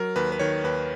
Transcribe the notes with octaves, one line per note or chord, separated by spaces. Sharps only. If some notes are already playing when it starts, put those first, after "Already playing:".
Already playing: F#3 A#4
D#2 B4
B4
D#3 C#5
D#2 B4